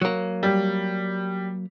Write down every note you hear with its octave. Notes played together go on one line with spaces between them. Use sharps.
F#3 A#3
G3